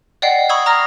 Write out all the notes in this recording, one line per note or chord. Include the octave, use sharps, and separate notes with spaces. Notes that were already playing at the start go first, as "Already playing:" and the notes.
D5 D#5 F#5 G5 C7
B5 C#6 D#6 E6 G#6
A#5 D#6 F6 A#6